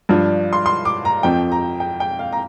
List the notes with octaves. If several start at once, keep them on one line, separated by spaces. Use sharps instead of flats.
G2 F3 D4 F4
C6
C6
D6
A#5
F2 F3 C4 G5
A#5
G5
G5
F5
A#5